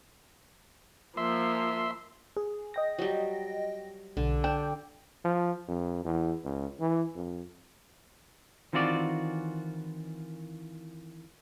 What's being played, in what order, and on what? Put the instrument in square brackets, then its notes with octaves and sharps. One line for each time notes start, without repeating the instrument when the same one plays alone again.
[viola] F3 A#3 [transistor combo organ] E5 C6
[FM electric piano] G#4
D#5 G5 A#6
[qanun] F#3 G3
[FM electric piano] B1 [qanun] D3
[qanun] D4 [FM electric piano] G5
[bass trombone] F3
F2
E2
C#2
E3
F2
[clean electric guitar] D#3 E3 C4 F4 F#4 D5